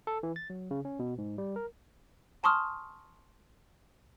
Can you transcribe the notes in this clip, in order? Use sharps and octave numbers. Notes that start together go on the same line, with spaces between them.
A4
E3
A6
F#3
C#3
C#4
B2
G#2
G3
A#4
G#5 A5 C6 C#6 D#6 F6